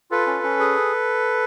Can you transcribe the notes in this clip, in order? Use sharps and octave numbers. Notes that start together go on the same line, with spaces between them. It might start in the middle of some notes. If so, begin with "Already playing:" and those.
F4 A4 B4
C#4
C#4
G#4